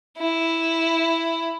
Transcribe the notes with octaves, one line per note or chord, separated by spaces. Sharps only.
E4